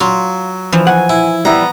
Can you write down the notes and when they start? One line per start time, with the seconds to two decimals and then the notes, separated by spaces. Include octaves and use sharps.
0.01 F#3 F4
0.72 E3 F3
0.87 F#5 G#5
1.09 E4
1.45 G3 B3 E4 A#5